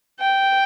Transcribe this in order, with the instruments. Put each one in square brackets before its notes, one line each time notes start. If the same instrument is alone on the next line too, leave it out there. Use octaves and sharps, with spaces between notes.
[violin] G5